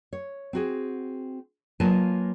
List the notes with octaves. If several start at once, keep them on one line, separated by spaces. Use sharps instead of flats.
C#5
C4 F#4 G#4
F#3 A#3 F4 B4 G#5 A5